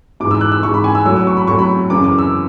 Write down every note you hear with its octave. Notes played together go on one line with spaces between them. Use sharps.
G#2 E3 D6
E6
F#6
E6
G#2 E3 C#6
B5
G#5
E6
A2 F#3 E6
E6
C#6
B5
A2 F#3 C#6
B5
F#2 C#3 E3 D6
D6
E6